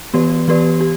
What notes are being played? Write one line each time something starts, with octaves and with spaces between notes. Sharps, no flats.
E3 B3 G4 B4 D5
E3 B3 G4 B4 D5
G4